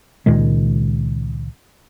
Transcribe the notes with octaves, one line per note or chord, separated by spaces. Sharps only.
C#2 A#2 D#3 G#3